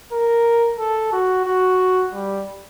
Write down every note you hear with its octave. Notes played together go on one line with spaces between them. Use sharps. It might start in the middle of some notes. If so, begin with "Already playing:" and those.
A#4
A4
F#4
F#4
G3